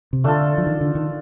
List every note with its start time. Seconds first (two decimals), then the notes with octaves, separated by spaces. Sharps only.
0.13 C3
0.24 D3 A3 D4 F4 A4
0.58 F3
0.67 D#3
0.81 D3
0.95 D#3